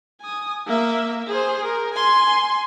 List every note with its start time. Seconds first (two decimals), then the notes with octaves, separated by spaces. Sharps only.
0.21 G#5 D#6
0.67 A#3 E5
1.27 G#4 C5
1.63 A#4
1.94 G#5 C6